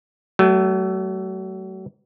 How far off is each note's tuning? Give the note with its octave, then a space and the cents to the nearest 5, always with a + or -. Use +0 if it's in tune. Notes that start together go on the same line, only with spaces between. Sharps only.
F#3 +35 A3 +0